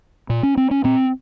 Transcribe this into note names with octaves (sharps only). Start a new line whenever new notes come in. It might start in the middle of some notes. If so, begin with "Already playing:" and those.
A#2
C#4
C4
C#4
A#2 C4